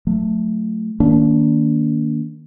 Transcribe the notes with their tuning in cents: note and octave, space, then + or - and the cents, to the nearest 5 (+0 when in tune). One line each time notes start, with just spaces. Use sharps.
F#3 -30 A3 +0
D#3 +0 A#3 +0 D4 -30